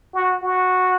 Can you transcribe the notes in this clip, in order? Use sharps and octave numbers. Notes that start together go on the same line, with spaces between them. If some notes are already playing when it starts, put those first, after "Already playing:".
F#4
F#4